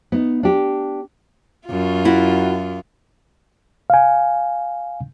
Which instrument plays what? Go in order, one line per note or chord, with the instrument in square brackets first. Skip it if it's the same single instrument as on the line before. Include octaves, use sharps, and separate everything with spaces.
[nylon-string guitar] B3 D#4
D4 G4
[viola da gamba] F#2 F4
[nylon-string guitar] E4 F#4
[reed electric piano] F5 G#5